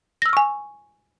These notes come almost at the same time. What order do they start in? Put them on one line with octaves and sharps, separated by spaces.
A#6 E6 F6 C#6 G#5